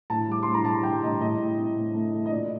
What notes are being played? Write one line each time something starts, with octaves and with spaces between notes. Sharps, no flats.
A2 A5
G3 D6
A2 C6
A#5
G3 A5
G3 G5
A2 D#5
A2 D#5
A2
C4
A2
A3
A3
D#5
A#2 D5